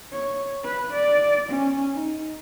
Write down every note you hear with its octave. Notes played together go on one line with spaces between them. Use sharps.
C#5
B4
D5
C#4
D#4